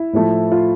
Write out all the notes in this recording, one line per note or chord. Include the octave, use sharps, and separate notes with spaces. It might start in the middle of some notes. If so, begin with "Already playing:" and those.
Already playing: E4
A2 F3 A3
F4